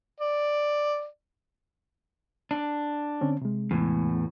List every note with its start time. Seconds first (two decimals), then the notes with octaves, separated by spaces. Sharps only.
0.21 D5
2.51 D4
3.21 D3 C4 C#4
3.42 C3 G#3
3.71 E2 A2